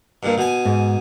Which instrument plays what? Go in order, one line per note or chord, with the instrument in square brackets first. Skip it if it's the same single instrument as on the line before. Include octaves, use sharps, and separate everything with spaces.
[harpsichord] G2 A#2
B2 G#5
[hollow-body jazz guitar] G#2